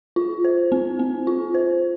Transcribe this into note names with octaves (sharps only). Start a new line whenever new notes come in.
F4
C5
C4
C4
F4
C5